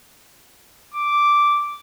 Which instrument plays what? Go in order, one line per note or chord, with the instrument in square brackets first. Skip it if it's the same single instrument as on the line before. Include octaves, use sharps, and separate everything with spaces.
[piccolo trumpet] D6